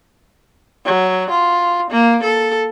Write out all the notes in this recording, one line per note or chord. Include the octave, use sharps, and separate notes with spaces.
F#3
F4
A#3
A4